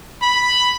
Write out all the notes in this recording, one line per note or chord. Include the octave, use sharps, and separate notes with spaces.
B5